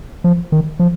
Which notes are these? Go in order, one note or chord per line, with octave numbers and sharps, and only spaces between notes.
F3
D#3
F3